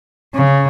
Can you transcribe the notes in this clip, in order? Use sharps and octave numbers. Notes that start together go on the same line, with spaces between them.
C#3